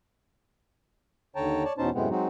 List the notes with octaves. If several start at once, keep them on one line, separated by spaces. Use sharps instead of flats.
D#2 D3 C#5 G5 A5 A#5
C#5 D5 A5
E2 B2 C#4 D#4 C5 A5
F#2 A2 C3 G#3 B3 C4
F#3 G#3 C4 D#4 F#4